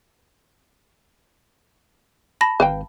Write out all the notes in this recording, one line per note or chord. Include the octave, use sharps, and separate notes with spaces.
A5 B5 A#6
G#1 B4 F5 G5